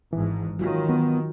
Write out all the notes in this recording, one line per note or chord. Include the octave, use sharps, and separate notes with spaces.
G#1 G#2 E3
D#3 F#3 F4
B3